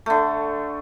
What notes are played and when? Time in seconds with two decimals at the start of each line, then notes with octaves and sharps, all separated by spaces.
0.06 D3 A3